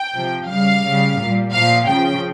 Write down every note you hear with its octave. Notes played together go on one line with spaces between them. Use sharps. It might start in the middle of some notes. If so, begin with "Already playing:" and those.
Already playing: G5
C3 F3
C#3 G3 F5
C#3 G3
A#2 G3
A#2 F3 F5
C#3 F3 G5